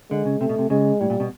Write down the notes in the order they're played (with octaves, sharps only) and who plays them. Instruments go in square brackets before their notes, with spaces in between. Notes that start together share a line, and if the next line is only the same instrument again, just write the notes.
[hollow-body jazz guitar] D3 [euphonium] G#3
[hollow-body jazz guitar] C#3
[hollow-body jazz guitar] C3 [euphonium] A3
[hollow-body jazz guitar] B2
C3
[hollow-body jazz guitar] C#3 [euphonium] G#3
[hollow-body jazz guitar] A2 [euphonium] G3
[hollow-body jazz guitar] A#2
B2